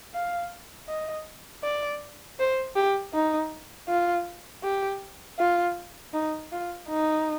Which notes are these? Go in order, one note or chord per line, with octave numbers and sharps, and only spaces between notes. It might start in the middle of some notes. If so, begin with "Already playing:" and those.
F5
D#5
D5
C5
G4
D#4
F4
G4
F4
D#4
F4
D#4